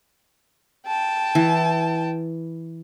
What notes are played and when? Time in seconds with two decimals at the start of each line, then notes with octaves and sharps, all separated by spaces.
0.87 G5 A5
1.35 E3